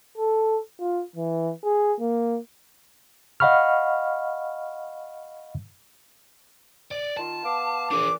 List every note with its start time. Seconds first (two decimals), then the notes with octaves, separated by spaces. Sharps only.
0.18 A4
0.80 F4
1.16 E3
1.64 G#4
2.00 A#3
3.40 D#5 F5 F#5 B5 C#6 F6
6.91 D5
7.17 D#3 F4 A5
7.44 B3 F5 D6
7.91 A#2 E3 D4 G#4 D6